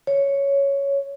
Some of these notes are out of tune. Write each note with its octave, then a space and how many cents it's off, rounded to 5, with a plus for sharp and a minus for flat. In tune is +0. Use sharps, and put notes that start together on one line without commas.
C#5 +5